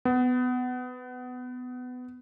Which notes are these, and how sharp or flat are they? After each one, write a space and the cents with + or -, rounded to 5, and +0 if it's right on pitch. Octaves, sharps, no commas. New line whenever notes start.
B3 +20